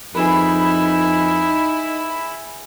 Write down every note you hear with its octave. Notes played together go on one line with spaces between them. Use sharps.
F2 D#4 E4 G#4 B4 B5